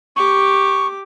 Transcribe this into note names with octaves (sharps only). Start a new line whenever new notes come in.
G4 C#6 D6